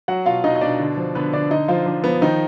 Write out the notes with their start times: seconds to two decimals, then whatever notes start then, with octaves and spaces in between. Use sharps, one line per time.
0.08 F#3 F#4 F#5
0.26 B2 F4 F5
0.44 B2 D#4 D#5
0.55 D#5
0.61 B2 D4 D5
0.79 D3
0.97 F3
1.15 D3 B3 B4
1.33 D3 D4 D5
1.51 D3 D#4 D#5
1.68 F3 F4
1.86 F3 D4
2.04 F3 B3
2.21 D#3 F3 D#4